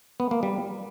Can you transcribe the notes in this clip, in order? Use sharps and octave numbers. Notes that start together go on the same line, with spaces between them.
B3
A#3
G3